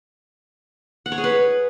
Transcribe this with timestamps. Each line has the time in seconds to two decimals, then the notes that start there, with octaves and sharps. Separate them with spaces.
1.06 F#5
1.12 C#5
1.18 G#4
1.24 B4